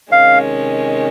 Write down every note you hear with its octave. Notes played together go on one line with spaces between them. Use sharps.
C3 D#3 G#3 C#4 F5